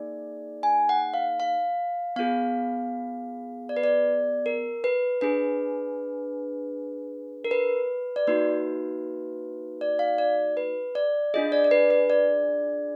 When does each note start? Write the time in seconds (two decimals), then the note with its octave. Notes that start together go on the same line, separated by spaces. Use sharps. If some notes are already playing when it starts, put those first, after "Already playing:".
Already playing: A#3 D#4 G#4 D5
0.63 G#5
0.89 F#5
1.14 F5
1.40 F5
2.16 B3 F4 G#4 F5
3.69 D5
3.77 B4
3.84 D5
4.46 A#4
4.84 B4
5.21 D4 G#4 B4
7.45 A#4
7.51 B4
8.16 D5
8.27 A#3 D#4 F#4 B4
9.81 D5
9.99 F5
10.18 D5
10.57 B4
10.95 D5
11.34 D4 F4 G#4 D#5
11.52 D5
11.64 D5
11.71 B4
11.91 B4
12.10 D5